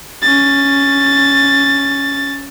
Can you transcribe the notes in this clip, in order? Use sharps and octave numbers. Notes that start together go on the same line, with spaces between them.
C#4 A6